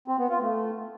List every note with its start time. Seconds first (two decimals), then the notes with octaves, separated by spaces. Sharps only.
0.08 C4
0.19 B3
0.30 F4
0.41 A3